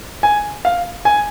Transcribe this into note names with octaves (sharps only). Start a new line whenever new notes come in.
G#5
F5
G#5